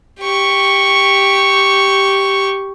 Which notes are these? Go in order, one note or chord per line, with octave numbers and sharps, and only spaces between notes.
G4 C#6